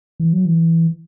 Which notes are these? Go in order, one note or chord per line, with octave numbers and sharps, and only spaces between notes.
E3
F#3
E3